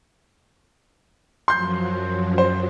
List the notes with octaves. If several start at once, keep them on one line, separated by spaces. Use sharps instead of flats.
F#2 F3 F#3 C6 G6
C5